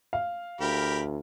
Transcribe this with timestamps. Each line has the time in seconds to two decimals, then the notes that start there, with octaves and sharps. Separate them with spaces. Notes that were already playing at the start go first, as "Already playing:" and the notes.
0.13 F5
0.61 D2 G4 A#4 B5